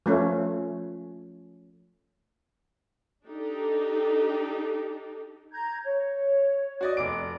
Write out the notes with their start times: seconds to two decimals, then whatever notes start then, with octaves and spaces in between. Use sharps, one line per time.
0.06 F3 A3 C#4
3.24 D4 D#4 G4 A4
5.52 A#5 G6 G#6
5.84 C#5
6.81 F#4 D5 D#5
6.97 F1 D6 D7